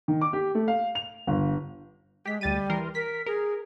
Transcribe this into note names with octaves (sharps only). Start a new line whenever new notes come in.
D#3
D6
G4
A3
F5
F7
G1
G#3 G4 B6
D2 G3 A6 D#7
E3 A#4 C6
A#4 B6
G#4 A#4